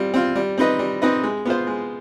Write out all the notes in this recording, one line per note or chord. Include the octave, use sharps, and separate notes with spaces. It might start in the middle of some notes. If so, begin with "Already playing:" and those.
Already playing: G3 C4 F4
C4 F4
G3
C4 D#4 B4 D#5
G3
C4 D#4 B4 D#5
G#3
B3 F4 C5
G#3